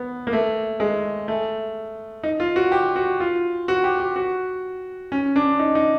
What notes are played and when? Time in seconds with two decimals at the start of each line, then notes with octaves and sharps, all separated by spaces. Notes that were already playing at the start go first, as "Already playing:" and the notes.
Already playing: B3
0.27 A#3
0.33 A3
0.80 G#3
1.28 A3
2.23 D#4
2.40 F4
2.56 F#4
2.72 G4
2.96 F#4
3.20 F4
3.68 F#4
3.84 G4
4.00 G4
4.16 F#4
5.12 C#4
5.36 D4
5.59 D#4
5.75 D#4